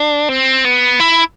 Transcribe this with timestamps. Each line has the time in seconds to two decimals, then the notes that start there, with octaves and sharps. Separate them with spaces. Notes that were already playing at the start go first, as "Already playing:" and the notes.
Already playing: D4
0.29 C4
0.65 B3
1.00 E4